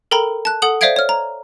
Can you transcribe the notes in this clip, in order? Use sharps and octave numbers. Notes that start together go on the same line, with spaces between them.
A4 A#4 G5 A#5 B5
A5 F#6
A4 F#5 D#6 F#7
C5 D5 E5 F5 G#6 D7
C#5 F6
A#5